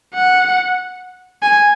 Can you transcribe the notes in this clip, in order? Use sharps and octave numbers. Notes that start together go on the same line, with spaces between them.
F#5
G#5